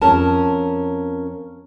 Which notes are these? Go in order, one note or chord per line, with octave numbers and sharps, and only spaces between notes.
F2 C#4 A#4 A5